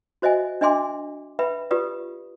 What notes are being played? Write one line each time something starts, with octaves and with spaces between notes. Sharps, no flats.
F#4 C5 D#5 E5 G#5
D4 D#5 E5 G#5 C6 D6
B4 E5 G5 B5
F4 G4 B4 D5 D#6